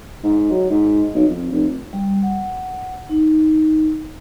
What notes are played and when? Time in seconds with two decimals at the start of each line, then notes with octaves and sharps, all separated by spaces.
0.23 G#2
0.50 F#3
0.70 G#2
1.14 B1
1.28 F2
1.52 F1
1.93 G3
2.22 F#5
3.09 D#4